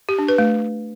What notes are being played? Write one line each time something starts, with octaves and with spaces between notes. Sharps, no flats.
G4
D4
B4
A3